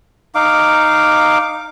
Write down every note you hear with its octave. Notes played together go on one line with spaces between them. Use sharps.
D#4 F5 D6